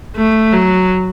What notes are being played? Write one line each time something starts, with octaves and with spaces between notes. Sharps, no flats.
A3
F#3